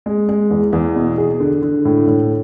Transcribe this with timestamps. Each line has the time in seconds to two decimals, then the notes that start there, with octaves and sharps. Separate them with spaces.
0.06 G#3
0.29 G#3
0.50 E2
0.73 E2
0.95 B2
1.18 G#4
1.40 D3
1.62 D3
1.85 A2
2.07 A2